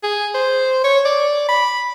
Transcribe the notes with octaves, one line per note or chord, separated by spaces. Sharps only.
G#4
C5
C#5
D5
B5